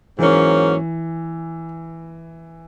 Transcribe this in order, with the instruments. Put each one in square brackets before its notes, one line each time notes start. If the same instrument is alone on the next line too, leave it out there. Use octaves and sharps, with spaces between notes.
[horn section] G#2 F#3 A#3 C#4 [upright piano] E3